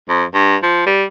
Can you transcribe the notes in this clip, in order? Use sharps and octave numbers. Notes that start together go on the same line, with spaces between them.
F2
G2
F3
G3